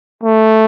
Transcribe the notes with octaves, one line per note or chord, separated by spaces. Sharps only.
A3